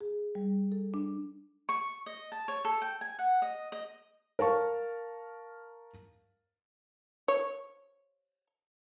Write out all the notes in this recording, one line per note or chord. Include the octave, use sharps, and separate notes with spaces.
G#4
G3
A4
D4
C#6
D#5
A5
C#5
A4
G5
G#5
F#5
D#5
D#5
A#4 F5 A5 C#6
C#5